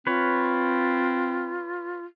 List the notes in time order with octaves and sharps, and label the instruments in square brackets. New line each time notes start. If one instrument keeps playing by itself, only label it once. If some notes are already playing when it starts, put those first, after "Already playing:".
[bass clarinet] C4 [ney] F4 [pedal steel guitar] B4 C#5